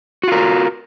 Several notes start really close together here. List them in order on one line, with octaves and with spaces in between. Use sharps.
F#4 F4 A#4